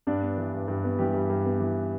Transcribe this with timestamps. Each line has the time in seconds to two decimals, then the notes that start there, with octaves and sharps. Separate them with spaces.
0.07 G2 D4 D5
0.22 B3
0.37 E3
0.54 G2
0.68 G2
0.84 B3
0.99 E3 G3 G4
1.14 G2
1.30 G2
1.46 B3
1.60 E3